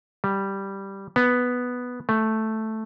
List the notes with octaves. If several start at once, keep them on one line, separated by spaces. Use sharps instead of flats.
G3
B3
A3